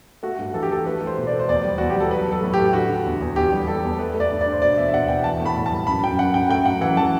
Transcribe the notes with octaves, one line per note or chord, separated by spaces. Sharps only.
A3 F#4
G2
E3 A4
G4
E3 A4
A3 B4
A3
C5
B2
D5
A3
C5
E2 D5
G3
E2 F#4
G4
G3
A4
F#3 B4
F#3 A4
A2
G4
A3
D3 F#4
D3
E2
E2
E2 G4
G3
G3 A4
E2
A3 B4
A3
D5
G2
D5
G2
C5
B2 D5
E2 E5
E5
B2 F#5
E2 G5
E3 A5
A2
B5
A2
A5
G3
F#2 B5
F#2 G5
F#2 F#5
F#2 G5
A3 G5
F#2 F#5
E3 F#5
E3 A5